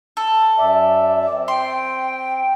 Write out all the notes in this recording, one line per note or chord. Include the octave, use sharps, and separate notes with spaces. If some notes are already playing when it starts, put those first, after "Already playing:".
A4
F#2 D5 E5
C4
G5 C6